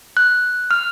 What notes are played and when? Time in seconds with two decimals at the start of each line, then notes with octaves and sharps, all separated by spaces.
0.17 F#6
0.71 F6